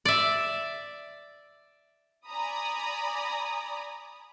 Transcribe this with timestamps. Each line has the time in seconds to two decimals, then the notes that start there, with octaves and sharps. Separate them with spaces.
0.05 D5 E5
2.27 D5 G#5 A#5 B5 D#6